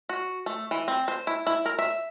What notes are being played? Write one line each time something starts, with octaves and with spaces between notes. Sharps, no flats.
F#4
A3
E3
C4
C5
E4
E4
A#4
E5